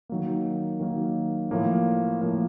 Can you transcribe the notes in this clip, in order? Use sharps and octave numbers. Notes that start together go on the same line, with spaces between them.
D#3 F#3 A#3
D#3 F#3 A#3
A2 F3 A#3
A2 F3 A#3